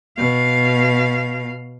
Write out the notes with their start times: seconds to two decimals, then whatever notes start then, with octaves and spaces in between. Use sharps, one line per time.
0.18 B2 F5